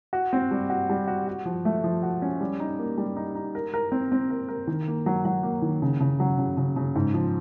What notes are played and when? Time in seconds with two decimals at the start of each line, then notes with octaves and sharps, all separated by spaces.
0.13 F#4
0.33 C4
0.51 G3
0.70 F#4
0.89 G3
1.08 F#4
1.28 F#4
1.45 F3
1.65 A3
1.84 F3
2.03 F#4
2.22 C#4
2.41 G3
2.60 D#4
2.79 A#3
2.98 G3
3.16 D#4
3.35 D#4
3.55 A#4
3.74 A#4
3.92 C4
4.12 C4
4.30 A#4
4.48 A#4
4.67 D#3
4.88 A#3
5.06 F#3
5.25 F#3
5.43 A#3
5.62 D#3
5.82 C#3
6.00 C#3
6.20 F#3
6.38 C#3
6.57 C#3
6.76 C#3
6.95 G#2
7.14 F3